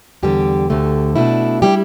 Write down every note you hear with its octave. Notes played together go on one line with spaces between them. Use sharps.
E2 D3 G3 G4
D2 D3 A3
B2 A3 D4 E4
G3 E4 G4